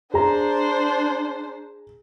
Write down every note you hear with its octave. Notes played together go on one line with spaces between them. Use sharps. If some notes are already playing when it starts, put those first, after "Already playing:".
D4 G#4 C5 A#5